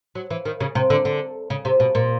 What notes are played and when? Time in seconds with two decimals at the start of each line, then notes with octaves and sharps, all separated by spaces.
0.15 F#3
0.30 E3
0.45 D#3
0.60 C#3
0.75 C3
0.90 D3
1.05 D3
1.50 C#3
1.65 C3
1.80 B2
1.95 A#2